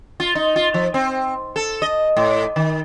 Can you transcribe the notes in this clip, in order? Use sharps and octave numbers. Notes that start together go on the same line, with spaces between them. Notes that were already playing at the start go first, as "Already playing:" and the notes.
F4
D#4
F4
F3
C4
A4
D#5
A2
D#3